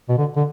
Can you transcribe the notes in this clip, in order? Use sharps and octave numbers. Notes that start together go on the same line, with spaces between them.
B2
D3
D3